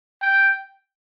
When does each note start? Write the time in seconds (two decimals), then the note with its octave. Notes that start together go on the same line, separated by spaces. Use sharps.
0.22 G5